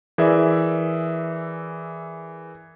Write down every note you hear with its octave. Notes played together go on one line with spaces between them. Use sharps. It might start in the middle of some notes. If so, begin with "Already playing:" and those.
E3 G#4 A#4 D5 E5